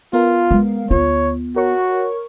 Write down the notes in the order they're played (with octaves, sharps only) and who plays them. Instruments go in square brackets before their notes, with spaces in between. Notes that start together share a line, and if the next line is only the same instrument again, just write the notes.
[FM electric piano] B3 A#4 F5 [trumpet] F4
[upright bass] G#3
[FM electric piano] D2 [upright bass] B3 F4 [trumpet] C#5
[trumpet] F#4 [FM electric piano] A#4 C#5 C#6